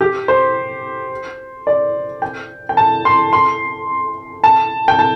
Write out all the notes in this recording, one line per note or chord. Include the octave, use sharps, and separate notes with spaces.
G4
C5
D5
G5
G5
A5
C6
C6
A5
G5
A5